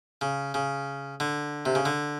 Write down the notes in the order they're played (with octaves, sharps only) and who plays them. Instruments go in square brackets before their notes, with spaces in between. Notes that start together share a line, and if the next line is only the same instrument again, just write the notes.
[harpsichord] C#3
C#3
D3
C3
C#3
D3